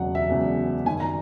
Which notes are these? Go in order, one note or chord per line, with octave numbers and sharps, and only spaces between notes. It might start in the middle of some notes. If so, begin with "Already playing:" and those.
Already playing: E1 E2 C#3 F#3 F#5
E5
E1 E2 C#3 F#3
F#2 D#3 F#3 G#5
A#5